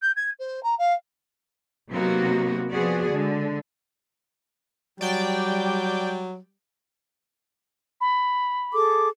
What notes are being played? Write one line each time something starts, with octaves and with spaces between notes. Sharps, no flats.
G6
G#6
C5
A#5
F5
C3 F#3 A#3 B3 D#4 F#4
F3 B3 F#4 G#4 D5
D3 G#3
F#3 G3 D5 G5
B5
G#4 A4 D6